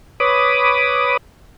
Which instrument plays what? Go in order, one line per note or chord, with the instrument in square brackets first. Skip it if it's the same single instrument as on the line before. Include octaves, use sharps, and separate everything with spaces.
[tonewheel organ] B4 C#5 B5 D6 D#6